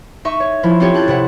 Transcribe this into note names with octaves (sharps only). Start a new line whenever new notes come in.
D#4 E5 C#6
C#5
F3 E4
C4 C#4 F4 G4 A4 C#5
A5 F#6 G6 A6
C3 E4 F#5